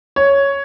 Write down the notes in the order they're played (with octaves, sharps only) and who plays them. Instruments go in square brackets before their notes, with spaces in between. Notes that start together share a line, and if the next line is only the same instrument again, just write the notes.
[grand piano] C#5